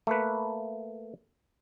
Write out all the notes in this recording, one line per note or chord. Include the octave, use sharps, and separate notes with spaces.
A3 A#3 B4